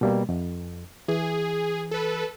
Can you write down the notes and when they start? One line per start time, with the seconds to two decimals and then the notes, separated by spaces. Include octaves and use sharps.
0.01 B2 G3 A#3
0.29 F2
1.08 E3 G#4
1.91 A4 B4